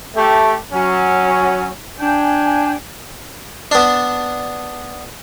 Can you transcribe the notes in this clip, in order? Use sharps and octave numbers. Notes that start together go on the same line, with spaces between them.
A3 G4
F#3 C#4
D4 G5 G#5
B3 D4